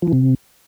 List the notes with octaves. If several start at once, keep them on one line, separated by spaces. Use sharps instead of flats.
F3
E3
C3